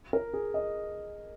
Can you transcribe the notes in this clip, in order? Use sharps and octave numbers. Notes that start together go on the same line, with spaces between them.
A#4
G#4
D#5